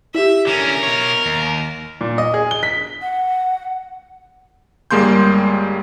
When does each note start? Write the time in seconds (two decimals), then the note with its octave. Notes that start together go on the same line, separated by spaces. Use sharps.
0.15 E4 G4 E5
0.47 D3 C#4 A#4
0.83 B2 C#5
1.25 D#2
2.01 A#2
2.18 D#5
2.34 G#4
2.51 G7
2.63 B6
3.02 F#5
4.91 G1 G3 G#3 A#3 C6 G6